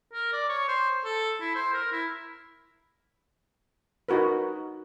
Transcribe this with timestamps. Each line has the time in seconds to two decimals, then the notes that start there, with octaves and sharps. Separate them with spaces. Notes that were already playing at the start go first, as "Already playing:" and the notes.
0.13 A#4
0.33 D5
0.49 C#5
0.68 C5
1.05 A4
1.41 E4
1.55 C5
1.73 A#4
1.92 E4
4.09 D#4 F#4 A#4 B4